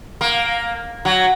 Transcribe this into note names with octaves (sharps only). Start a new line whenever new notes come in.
A#3
F#3